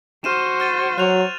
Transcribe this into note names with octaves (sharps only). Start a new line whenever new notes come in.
F#4 C5 F6 D#7 E7
F6 A6 D#7
F#3 F#6 F7